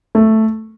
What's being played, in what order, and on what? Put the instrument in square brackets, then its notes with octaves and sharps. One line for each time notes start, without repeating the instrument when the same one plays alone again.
[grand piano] A3